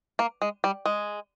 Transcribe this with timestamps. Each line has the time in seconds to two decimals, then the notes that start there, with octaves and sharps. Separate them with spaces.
0.19 A#3
0.42 G#3
0.64 G3
0.85 G#3